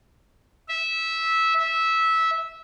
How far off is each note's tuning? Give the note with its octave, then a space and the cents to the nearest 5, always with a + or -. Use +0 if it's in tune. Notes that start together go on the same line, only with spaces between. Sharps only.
E5 -15
E5 -15